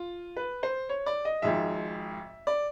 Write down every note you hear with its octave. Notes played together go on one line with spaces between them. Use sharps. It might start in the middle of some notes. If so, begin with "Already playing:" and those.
Already playing: F4
B4
C5
C#5
D5
D#5
G#1 G#2 F3 E5
D5